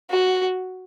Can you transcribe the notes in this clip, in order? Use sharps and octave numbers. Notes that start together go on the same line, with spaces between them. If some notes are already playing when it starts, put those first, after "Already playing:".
F#4